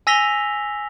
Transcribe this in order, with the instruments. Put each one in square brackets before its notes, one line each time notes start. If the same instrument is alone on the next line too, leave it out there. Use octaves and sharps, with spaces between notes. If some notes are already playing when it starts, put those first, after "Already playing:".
[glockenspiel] G#5 E6 A#6 B6 F7 G7